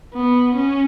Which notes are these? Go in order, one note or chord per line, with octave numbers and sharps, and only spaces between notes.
B3
C#4